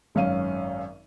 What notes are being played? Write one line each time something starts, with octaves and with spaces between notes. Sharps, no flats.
G#1 F#2 C#4 F5 D#7